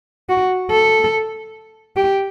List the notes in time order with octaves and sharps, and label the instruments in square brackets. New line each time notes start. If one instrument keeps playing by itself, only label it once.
[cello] F#4
A4
G4